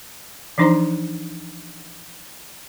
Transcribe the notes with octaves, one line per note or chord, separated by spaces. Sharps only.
E3 F3 D4 D#4 C5 A#5